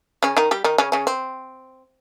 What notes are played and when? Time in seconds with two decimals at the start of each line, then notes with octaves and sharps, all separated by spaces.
0.22 C#3 C#4
0.37 D#3 D#4
0.51 G3 G4
0.64 D#3 D#4
0.78 C#3 C#4
0.92 C#3 C#4
1.07 C4